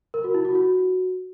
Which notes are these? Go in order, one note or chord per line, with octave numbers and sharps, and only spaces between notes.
A#4
F#4
E4
F#4
F#4